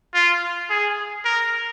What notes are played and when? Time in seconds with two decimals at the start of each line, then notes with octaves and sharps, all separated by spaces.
0.14 F4
0.70 G#4
1.25 A#4